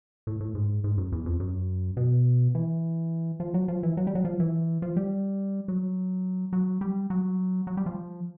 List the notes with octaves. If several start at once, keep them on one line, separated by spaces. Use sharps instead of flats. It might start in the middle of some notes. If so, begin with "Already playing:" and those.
A2
A2
G#2
G#2
F#2
E2
F2
F#2
B2
E3
F3
F#3
F3
E3
F#3
G3
F#3
F3
E3
F3
G3
F#3
F#3
G3
F#3
F#3
G3
F3